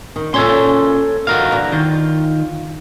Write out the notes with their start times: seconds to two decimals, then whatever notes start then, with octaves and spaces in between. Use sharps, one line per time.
0.16 D#3
0.34 A#2 C#3 C#4 A4 C#5 C6
1.27 G2 D#3 F#4 A#4 F5
1.52 D3 E3
1.72 D#3 F4